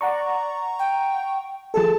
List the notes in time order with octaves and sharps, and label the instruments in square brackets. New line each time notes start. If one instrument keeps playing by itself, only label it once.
[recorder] D5 [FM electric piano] F#5 A#5 C#6
[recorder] G5
[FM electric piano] F3 G#4 A4 [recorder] A5